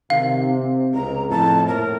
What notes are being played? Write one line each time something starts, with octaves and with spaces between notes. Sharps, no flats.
C3 D#3 F5
C4
C#2 A#5
F2 A2 A5
A#2 A#4